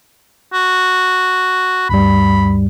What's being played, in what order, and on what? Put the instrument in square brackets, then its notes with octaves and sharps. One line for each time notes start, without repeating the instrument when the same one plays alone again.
[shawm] F#4
[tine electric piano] D2 G2 G3 [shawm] B5